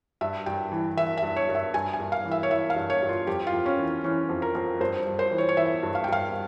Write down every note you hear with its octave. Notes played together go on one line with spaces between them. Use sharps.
G2 E5
G2 G5
E3
E3 E5
E5
G2
C#5
G2
E5
G2 G#5
G#5
G2
F5
E3
E5
C#5
E3 E5
F5
G2
C#5
G2
F4
F2 G4
F4
F2
C#4
E3
E3 C#4
F2
A#4
F2
G2 C5
G2
C5
E3
C#5
C#5
E3 E5
G2
F5
G5
G2 F5